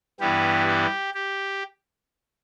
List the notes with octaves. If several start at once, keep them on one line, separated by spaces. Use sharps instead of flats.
G2 E3 G3 B3 G4
G4
G4